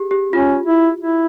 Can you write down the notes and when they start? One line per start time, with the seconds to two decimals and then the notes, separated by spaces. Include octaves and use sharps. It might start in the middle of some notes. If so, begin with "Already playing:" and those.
Already playing: G4 G#4
0.11 G4
0.33 C#4 F4
0.66 E4
1.00 E4